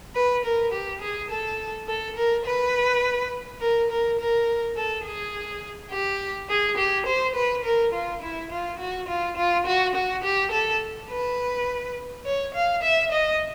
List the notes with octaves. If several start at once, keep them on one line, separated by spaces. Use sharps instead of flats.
B4
A#4
G4
G#4
A4
A4
A#4
B4
A#4
A#4
A#4
A4
G#4
G4
G#4
G4
C5
B4
A#4
F4
E4
F4
F#4
F4
F4
F#4
F#4
G4
A4
B4
C#5
F5
E5
D#5